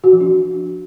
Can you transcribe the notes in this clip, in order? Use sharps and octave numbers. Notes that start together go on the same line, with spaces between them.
F#4
F3
D4